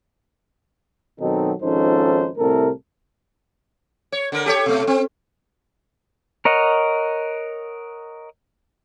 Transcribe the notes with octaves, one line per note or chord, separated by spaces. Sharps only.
B2 D#3 F#3 C4 D#4 A4
G#1 F3 C#4 D#4 A4 C5
C2 A2 C3 A4 A#4
C#5
D3 A#4
G4 A4 C#5
B2 A3
C4
A#4 C#5 D#5 F#5